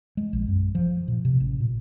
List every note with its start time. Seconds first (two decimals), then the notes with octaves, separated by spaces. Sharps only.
0.17 G#3
0.33 A#1
0.48 F#2
0.75 F3
1.08 A#2
1.25 C3
1.40 A1
1.60 A#2